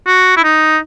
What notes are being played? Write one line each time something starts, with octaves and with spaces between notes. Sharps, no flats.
F#4
E4
D#4